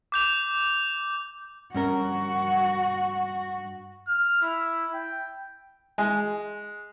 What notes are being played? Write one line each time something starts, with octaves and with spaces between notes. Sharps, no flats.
D6 G6 F7
G2 C#4 F#4 A#4
F6
E4
G5
G#3